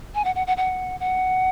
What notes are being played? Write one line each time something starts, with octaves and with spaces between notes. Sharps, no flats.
G#5
F#5
F#5
F#5
F#5
F#5